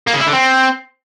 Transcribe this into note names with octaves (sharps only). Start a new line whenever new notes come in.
A#3
C#3
E4
D3
C4